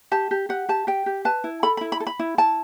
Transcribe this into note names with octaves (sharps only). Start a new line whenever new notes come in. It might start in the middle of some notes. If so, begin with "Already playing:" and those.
G4 A5
G4
G4 F#5
G4 A5
G4 G5
G4
B4 A5
E4
A4 B5
B5
E4
B5
A4
B5
E4
E4 A5